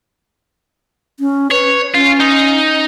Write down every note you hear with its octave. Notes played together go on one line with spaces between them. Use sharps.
C#4
B4 C#5
C#4 F4
D#4